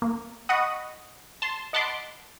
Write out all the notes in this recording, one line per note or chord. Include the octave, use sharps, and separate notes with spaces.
A#3
D#5 F#5 B5 C#6 D#6
A5 C6
D#5 F#5 A5 B5 C6 D6